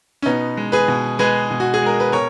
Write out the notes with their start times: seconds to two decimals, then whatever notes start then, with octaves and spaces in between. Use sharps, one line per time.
0.22 C#4
0.26 B2 B3 D#4
0.57 G#3
0.72 G#4 B4
0.88 B2
1.19 G#3 G#4 B4
1.51 B2
1.60 F#4
1.74 G#4
1.82 G#3 A#4
2.00 B4
2.12 B2 A#4 C#5